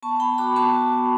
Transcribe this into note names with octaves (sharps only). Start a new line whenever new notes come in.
B3 A5 C#6
B3 G5 B5
F#4 B5 D6
B3 A5 C#6
F#4
B3